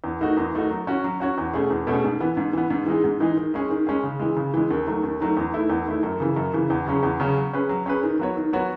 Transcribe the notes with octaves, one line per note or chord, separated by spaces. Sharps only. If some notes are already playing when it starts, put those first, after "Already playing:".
E2
D#3 A3 D#4 F#4
E2
D#3 A3 D#4 F#4
F#3
C#4 F#4 C#5
F#3
C#4 F#4 C#5
E2
B2 A3 C#4 G#4
E2
B2 A3 C#4 G#4
G#2
E3 B3
G#2
E3 B3
G#2
E3 G#3 D#4 G#4
G#2
E3 G#3 D#4 G#4
D#3
G#3 C#4 G#4
D#3
G#3 C#4 G#4
C#3
E3 G#3
C#3
E3 G#3
D#2
D#3 F#3 A3
D#2
D#3 F#3 A3
E2
D#3 A3 E4
E2
D#3 A3 E4
F#2
C#3 E3
F#2
C#3 E3
E2
C#3 F#3 C#4 G#4
E2
C#3 F#3 C#4 G#4
F#3
C#4 G#4 B4
F#3
C#4 G#4 B4
D#3
F#3 B3 F#4 C#5
D#3
F#3 B3 F#4 C#5